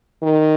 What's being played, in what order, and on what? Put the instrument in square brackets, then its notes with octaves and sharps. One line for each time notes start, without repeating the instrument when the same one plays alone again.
[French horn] D#3